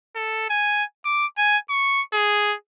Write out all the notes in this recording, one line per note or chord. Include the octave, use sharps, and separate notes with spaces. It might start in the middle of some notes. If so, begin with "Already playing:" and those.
A4
G#5
D6
G#5
C#6
G#4